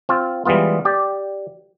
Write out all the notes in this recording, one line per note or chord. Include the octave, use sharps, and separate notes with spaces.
C4 F4
E3 G3 G#3 B3 F4
G4 D5